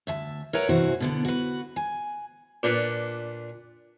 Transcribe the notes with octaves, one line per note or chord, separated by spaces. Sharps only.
D2 E5 A5
A#4 B4 C#5 E5 F#5 A#5
G2 C3 E3 F#4 C5
B2 D3 B3
F#4 B4
G#5
A#2 D4 B4